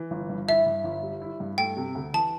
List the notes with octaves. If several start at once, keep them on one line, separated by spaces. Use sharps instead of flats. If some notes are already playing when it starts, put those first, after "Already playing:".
Already playing: E3
G1
G2
E4 E5
G2
G1
G3
E4
G2
A3 G5
C3
D2
E3 A5